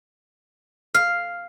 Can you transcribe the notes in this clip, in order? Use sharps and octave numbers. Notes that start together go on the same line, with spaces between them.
F5